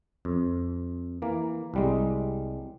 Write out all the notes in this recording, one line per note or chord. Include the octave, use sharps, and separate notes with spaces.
F2
E3 A#3
C2 G3 G#3